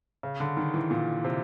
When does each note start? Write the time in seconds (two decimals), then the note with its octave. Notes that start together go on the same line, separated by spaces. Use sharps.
0.23 C#3
0.40 D3
0.57 D#3
0.74 E3
0.91 A#2
1.25 C3